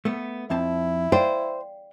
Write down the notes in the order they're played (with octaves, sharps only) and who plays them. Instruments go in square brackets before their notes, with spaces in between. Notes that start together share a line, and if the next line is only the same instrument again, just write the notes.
[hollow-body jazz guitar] A3 B3
[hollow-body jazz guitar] F2 C4 A5 [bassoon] E4
[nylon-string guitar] C5 [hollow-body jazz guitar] D5 F5 G5